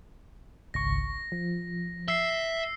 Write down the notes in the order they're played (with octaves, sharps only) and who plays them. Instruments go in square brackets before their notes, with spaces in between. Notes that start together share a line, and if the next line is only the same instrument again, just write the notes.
[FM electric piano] G#1 C#2 C#6 [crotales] A#6
[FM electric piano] F3
[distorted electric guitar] E5 [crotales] E6 C7